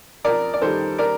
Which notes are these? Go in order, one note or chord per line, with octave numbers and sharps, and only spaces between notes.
F2 A#4 D5
D5
D#3 G3 A4 C5
A#4 D5